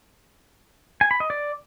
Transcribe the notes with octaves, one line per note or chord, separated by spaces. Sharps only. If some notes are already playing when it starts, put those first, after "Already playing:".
G#5
B5
D#5
D5